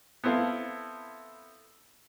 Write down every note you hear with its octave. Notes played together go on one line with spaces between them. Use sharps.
B3 C4 E4 A4 F5